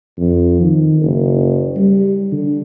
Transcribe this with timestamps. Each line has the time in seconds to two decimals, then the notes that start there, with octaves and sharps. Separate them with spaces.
0.18 F2
0.61 D#3
1.02 F#1
1.77 G3
2.32 D3